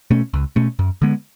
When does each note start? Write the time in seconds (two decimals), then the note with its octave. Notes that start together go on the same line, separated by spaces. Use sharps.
0.11 B2 A3 C#4
0.33 C#2
0.56 B2 A3 C#4
0.79 F#2
1.02 D3 G#3 B3